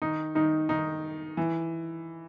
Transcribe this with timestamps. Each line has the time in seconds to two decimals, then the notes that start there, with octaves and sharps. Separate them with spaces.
0.02 D#3 D#4
0.35 D#3 D#4
0.69 D#3 D#4
1.37 E3